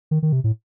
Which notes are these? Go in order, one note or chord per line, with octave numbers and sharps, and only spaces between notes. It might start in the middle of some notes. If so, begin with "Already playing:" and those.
D#3
D#3
C3
A2